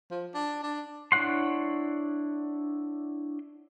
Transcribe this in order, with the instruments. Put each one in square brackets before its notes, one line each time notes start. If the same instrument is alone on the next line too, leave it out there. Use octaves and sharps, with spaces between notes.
[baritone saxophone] F3
D4
D4
[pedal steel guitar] D4 E4 C#5 F#5 C6